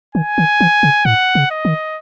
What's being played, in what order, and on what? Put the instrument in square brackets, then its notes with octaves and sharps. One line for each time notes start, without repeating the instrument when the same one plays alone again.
[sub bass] D#3 [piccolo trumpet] G#5
[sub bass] D#3
E3
C#3
[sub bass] A2 [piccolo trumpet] F#5
[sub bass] C#3
[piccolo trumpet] D#5
[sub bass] D#3